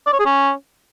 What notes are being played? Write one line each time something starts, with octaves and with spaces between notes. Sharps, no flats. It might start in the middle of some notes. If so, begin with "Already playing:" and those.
D5
C#5
G#4
C#4